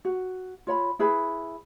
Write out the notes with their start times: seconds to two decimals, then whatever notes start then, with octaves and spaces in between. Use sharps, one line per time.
0.05 F#4
0.67 F4 C#5 B5
0.99 E4 G#4 B4 B5